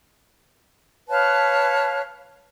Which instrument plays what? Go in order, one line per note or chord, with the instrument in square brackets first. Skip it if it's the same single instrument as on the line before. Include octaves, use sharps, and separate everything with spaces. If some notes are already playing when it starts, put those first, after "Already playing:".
[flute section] B4 C#5 F5 A5